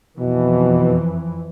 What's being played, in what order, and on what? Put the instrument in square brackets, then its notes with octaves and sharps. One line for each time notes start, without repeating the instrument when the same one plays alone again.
[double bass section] F2 E3 [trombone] B2